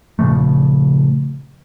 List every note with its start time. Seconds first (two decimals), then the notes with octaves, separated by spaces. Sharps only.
0.19 A#2 C#3 F3 A3